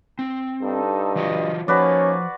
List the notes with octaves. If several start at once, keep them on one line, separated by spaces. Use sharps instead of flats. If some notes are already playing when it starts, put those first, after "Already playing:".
C4
G2 D#4 A4
E3 F4 F#4 D#5
F3 A#3 C#4 D#4 F#4 B4 C#5 D5